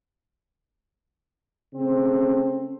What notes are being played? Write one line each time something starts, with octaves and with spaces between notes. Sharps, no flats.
C#3 A3 C4